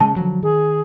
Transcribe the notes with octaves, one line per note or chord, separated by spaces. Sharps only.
C#3 G#3 A5
D3 F3 F#3
D#3 G#4